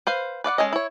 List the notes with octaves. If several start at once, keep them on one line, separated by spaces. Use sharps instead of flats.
B4 C5 F5
B4 D5 F5 F#5
G#3 C#4 A4 D#5
E4 C#5